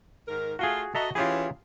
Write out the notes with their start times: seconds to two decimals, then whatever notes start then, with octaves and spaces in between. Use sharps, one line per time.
0.27 G#2 D#3 A#4
0.59 A3 F4 F#4 G#4
0.95 F#4 A4 D#5 E5 A#5
1.15 E3 C#4 F4 G4 G#4